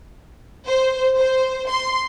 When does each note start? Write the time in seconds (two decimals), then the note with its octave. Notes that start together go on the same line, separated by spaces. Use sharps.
0.66 C5
1.18 C5
1.67 C6